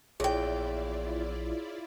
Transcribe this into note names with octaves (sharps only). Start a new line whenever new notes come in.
A#1 E2 E4 F4 G#4 C#5 D5 G5